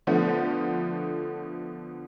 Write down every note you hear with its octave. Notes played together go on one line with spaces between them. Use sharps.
D3 F3 A3 B3